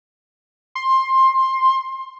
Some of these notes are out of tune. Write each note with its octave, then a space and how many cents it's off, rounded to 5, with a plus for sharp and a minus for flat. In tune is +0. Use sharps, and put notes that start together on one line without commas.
C6 +15